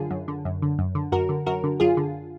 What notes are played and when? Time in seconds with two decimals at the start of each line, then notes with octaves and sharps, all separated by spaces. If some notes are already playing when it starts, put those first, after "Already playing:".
Already playing: F#2 D3 F4 G#4
0.10 F#2
0.28 D3
0.45 F#2
0.62 D3
0.79 F#2
0.95 D3
1.12 F#2 F#4 A#4
1.29 D3
1.46 F#2 F#4 A#4
1.64 D3
1.80 F#2 F4 G#4
1.97 D3